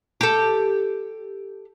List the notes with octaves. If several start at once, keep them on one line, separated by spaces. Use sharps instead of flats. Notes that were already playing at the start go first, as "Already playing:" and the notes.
G4 A4